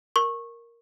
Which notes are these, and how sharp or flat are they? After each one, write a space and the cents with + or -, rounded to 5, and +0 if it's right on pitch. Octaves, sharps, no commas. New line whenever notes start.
A#4 +0 C#6 -20